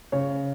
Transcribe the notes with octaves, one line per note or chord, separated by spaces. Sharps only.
C#3 C#5